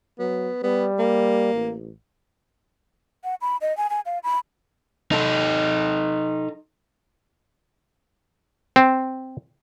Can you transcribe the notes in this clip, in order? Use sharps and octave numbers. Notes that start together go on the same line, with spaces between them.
F#3 B3
G3 B3
A#3
A1
F#5
B5
D#5
G#5
G#5
F5
B5
D#4 A4
C4